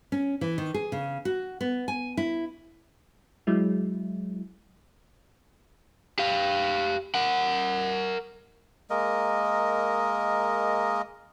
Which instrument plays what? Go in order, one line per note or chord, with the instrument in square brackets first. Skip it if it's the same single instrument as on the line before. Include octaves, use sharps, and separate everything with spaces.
[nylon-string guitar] C#4
E3
D#3
G#4
C#3
F#4
B3
G#5
E4
[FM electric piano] F#3 G#3 E4
[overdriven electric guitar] G4 F5
A#4 F#5
[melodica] G#3 A#3 A#4 D#5